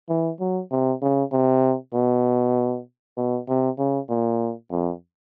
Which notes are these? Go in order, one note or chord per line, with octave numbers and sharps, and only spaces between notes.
E3
F#3
C3
C#3
C3
B2
B2
C3
C#3
A#2
F2